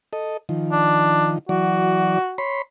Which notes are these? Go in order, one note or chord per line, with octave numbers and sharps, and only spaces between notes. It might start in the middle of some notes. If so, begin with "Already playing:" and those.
A4 D#5
D#3 F3
D4
E3 F#3 F#4 D5
C#5 B5 C6